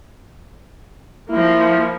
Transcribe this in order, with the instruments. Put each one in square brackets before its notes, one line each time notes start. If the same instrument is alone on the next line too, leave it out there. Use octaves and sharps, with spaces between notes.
[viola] F3 A#3 [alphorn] E4